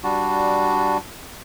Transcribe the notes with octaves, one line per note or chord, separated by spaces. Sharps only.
G3 D4 F#4